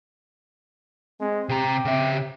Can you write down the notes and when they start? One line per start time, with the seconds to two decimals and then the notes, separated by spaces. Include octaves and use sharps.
1.20 G#3 C4
1.49 C3 G4 A#5
1.85 C#3 E5